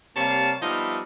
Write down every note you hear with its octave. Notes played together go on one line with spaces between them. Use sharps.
C3 G3 A#3 C#5 F5 A5
F3 G3 B3 D#4 E5 F5